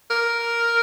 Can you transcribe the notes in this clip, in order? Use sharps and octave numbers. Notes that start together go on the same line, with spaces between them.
A#4